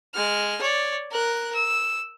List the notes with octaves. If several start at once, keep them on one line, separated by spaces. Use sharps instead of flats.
G#3 F6
C#5 D5
A#4 F#6
E6